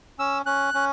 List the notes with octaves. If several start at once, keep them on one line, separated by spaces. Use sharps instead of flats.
C#4 E6
C#4 F#6
C#4